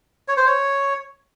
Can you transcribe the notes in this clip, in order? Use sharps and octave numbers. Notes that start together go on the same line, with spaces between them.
C#5
C5
C#5